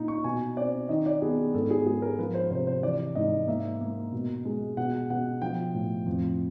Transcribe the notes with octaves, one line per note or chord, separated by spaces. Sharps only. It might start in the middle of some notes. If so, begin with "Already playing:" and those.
Already playing: A#2 D#4
C#6
B2 G#5
C4 D5
D#3 D#5
D5
B3 G#4
G#2 A4
G#4
G#3 G#4
A#4
F3 B4
C5
C3 C5
C5
E3 D5
G#2 D#5
A#3 E5
A#3
B2
G#3
B2 F#5
B2 F#5
F3 G5
A2
F2